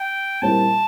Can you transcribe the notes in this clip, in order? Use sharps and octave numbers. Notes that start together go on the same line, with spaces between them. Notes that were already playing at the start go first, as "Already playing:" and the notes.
Already playing: G5
A#2 G3 C4 E4 A#4 A5